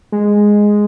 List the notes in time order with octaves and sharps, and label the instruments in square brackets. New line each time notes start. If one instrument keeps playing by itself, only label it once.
[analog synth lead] G#3